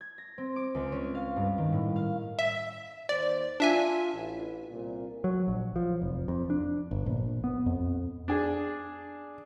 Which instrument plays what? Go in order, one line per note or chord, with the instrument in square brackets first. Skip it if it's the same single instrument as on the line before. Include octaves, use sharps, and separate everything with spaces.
[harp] G#6
A#6
C4
D6
C#2
C#4
F5
G2
D#3
A2
F5
[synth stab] E5
[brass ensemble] D#2 C5 [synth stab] D5
[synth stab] D4 E5 G#5 [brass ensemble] F4
[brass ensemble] A1
C2 A#2
[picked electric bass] F#3
A#1
F3
F1
F2
D4
G1
A#1
B3
F2
[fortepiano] D4 G#4